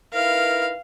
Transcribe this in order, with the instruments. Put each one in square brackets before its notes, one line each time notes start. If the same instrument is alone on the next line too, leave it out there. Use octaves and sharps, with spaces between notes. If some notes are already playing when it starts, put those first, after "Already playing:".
[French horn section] D#4 E4 B4 [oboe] A#4 [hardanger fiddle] F5